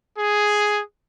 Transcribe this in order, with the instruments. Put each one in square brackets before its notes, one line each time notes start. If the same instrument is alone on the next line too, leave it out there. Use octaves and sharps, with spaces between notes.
[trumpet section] G#4